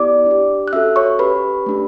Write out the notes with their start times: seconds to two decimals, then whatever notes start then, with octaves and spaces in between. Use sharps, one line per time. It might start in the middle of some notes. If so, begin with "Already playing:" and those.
Already playing: B3 E4 G4 D5 D6
0.26 D4 G4
0.68 F#6
0.73 C#4 F#4 A4 E5 E6
0.96 C#5 C#6
1.19 C#4 G4 B4 B5
1.66 A3 D4 G4